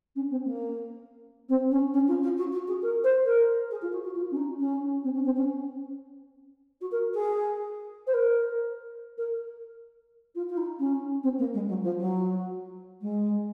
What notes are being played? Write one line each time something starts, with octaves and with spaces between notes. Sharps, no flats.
C#4
C4
A#3
C4
C#4
C#4
F4
F4
F#4
F#4
G#4
A#4
C5
A#4
G#4
F4
F#4
F#4
F4
C#4
D#4
C#4
C4
C#4
C4
C#4
F#4
A#4
G#4
C5
A#4
A#4
F4
F4
D#4
C#4
C4
A#3
G#3
F#3
F3
F#3
G#3